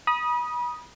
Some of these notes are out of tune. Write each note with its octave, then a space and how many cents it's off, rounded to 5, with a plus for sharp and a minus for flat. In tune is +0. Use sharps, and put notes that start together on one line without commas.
B5 -35 D#6 +0